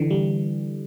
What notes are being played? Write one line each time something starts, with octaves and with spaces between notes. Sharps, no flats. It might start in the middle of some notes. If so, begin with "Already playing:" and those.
Already playing: D3 E3
G3